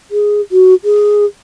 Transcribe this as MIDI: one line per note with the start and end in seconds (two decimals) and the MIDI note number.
0.11 0.41 68
0.52 0.74 66
0.84 1.25 68